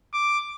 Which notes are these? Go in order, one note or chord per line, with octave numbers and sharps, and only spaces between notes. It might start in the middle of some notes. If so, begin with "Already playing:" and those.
D6